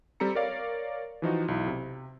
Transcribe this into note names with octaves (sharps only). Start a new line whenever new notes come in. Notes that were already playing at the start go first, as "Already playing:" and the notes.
G3 C4 A4 A#5 C#7
A#4 C#5 D5 F5
E3 F3 D#4 F#4
B1 E4
C3